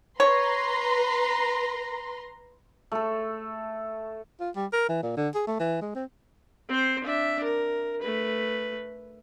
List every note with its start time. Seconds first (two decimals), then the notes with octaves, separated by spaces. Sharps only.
0.20 B4 C#5 A#5 C6
2.92 A3 A4
4.40 F4
4.56 G3
4.73 A#4
4.89 E3
5.03 A#2
5.17 D3
5.35 G#4
5.47 A3
5.60 E3
5.82 G#3
5.95 C4
6.69 C4 C5
7.03 D4 E5
7.44 A#4
8.02 A3 B4